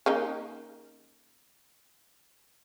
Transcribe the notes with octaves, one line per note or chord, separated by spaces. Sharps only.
C#3 A#3 D#4